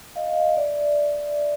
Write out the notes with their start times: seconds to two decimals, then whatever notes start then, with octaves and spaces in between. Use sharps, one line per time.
0.16 D#5 F5
0.57 D5 E5